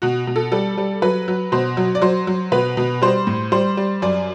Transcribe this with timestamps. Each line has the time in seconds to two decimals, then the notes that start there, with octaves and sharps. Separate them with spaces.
0.02 B2 F#4
0.27 B2
0.36 A4
0.52 G3 A4
0.78 G3
1.02 F#3 B4
1.28 F#3
1.52 B2 C5
1.77 F#3
1.95 D5
2.02 F#3 C5
2.27 F#3
2.52 B2 B4
2.77 B2
3.02 G3 C5
3.27 A2
3.52 G3 C5
3.77 G3
4.02 F#2 D5